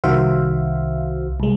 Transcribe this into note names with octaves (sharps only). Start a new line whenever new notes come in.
C2 D#3 F#4 C5 E5 F5
C2 G#3